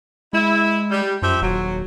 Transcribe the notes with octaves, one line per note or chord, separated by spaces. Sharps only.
G#3 E4
G3
F#2 F3 G4 E5
D#1 F#3